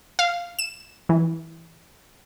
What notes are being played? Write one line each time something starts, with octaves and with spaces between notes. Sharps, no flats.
F5
E7
E3